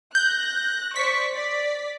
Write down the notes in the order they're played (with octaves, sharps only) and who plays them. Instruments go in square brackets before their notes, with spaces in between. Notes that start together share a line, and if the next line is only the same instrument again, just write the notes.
[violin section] F#6 A#6 [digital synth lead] G6
[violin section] C5 D5 C#6 [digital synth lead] B6
[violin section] D5